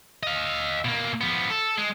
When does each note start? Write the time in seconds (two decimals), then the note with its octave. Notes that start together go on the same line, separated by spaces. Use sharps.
0.23 D#5 F5
0.85 B2 A#3
1.21 F3 B3
1.50 A4
1.78 G#3